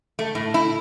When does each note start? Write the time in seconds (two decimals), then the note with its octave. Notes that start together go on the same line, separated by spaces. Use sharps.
0.19 A3
0.35 A2
0.54 E4